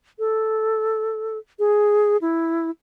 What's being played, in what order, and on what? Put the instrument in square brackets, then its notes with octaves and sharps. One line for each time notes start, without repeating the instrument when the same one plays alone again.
[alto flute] A4
G#4
E4